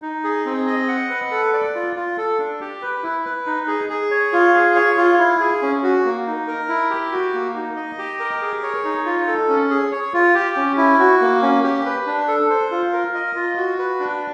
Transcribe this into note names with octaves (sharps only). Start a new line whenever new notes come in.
D#4
G#4
C4
D#5
F#5
B4
A4
D5
F4
F4
A4
D4
G4
B4
E4
B4
D#4
G#4
G#4
C#5
F4
G#4
C#5
F4
E4
G#4
C#4
F#4
A#3
D#4
A#4
E4
G4
F#4
A#3
D#4
D#5
G4
A#4
G#4
C#5
D#4
F4
A4
C#4
G#4
C#5
F4
G4
C#4
E4
F#4
A#3
C#4
G4
B4
D4
A4
C5
F4
A#4
D#5
F4
F#4
B4
D4